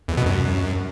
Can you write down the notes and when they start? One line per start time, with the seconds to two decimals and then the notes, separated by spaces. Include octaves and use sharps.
0.08 E2
0.17 B2
0.26 F#2